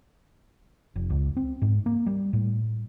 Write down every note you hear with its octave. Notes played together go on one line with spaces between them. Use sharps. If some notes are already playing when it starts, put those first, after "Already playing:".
F1
C#2
C4
G#2
A#3
G3
A2